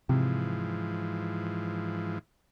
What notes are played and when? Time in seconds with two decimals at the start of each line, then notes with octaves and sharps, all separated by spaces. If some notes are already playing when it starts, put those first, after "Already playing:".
0.09 G#2 C3 E3 F3